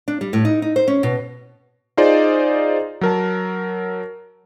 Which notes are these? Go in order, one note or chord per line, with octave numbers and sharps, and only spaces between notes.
D4
G3
A2
D#4
D#4
C5
C#4
B2
D#4 F4 G#4 C5 D5 D#5
F#3 A#4 A5